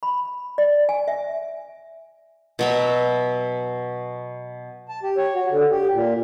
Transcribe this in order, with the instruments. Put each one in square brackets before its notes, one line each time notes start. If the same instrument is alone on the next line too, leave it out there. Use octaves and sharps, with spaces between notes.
[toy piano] B5
D5
G#5
E5
[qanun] B2 F#3 E5
[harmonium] A5
G4
C#5
F#4
D3
G4
A#2